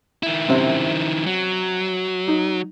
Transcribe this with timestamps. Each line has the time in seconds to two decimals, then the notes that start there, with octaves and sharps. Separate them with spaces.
0.23 D#3 E4
0.48 F#2 C3 C4
1.26 F#3
2.28 D#4